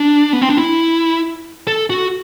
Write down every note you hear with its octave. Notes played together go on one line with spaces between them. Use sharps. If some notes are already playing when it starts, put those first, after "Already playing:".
Already playing: D4
B3
C4
D4
E4
A4
F#4